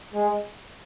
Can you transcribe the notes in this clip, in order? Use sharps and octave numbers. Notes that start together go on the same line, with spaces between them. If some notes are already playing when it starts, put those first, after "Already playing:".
G#3